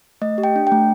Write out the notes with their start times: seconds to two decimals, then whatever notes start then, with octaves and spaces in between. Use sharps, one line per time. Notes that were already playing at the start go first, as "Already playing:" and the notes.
0.22 A3 D#5
0.38 G4
0.44 G5
0.56 D4
0.67 A3 G5